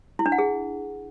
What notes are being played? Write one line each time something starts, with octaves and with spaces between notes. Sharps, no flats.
E4
D4
F#5
G#4